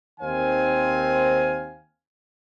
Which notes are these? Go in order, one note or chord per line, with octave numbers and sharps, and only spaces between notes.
D#2 D#3 C4 C5 F5 G#5